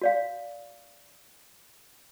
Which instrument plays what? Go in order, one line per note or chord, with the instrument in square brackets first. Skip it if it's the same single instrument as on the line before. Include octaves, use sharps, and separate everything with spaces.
[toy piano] F#4 D5 F5